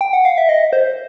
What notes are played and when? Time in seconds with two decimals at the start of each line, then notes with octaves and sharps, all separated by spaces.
0.01 G5
0.13 F#5
0.25 F5
0.38 E5
0.49 D#5
0.73 C5